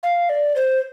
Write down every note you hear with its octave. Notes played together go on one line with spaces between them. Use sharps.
F5
D5
C5